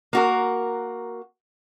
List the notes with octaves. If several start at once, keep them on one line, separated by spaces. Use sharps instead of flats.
A#3 F#4 A#4